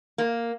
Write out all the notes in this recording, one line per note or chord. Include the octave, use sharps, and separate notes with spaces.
A#3